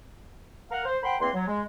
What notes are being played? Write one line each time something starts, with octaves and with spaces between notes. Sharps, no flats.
A#4 F5 F#5
C5
A#4 C5 F#5 G5 B5 C6
E2 A#3 C4 B4 C6
F#3
G#3